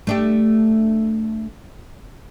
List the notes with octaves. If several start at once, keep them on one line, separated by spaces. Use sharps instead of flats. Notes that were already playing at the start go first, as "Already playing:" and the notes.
A3 D4 G4